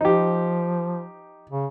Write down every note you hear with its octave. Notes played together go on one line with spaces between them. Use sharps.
F3 D#4 G4
C#3